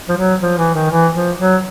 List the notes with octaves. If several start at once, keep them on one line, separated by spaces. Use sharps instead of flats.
F3
F#3
F3
E3
D#3
E3
F3
F#3